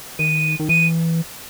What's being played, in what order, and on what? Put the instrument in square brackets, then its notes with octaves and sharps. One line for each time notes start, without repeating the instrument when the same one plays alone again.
[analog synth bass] D#3 [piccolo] D#7
[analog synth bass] D#3
[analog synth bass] E3 [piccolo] D#7